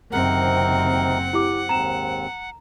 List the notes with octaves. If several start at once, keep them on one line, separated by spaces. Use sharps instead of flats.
F#1 C3 D#3 C4 A#4 F#5
E4 G4 D6
D#2 G#2 C4 A#5 E7